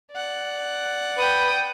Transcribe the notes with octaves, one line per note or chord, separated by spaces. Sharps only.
D5 F#5
B4 G5 D#6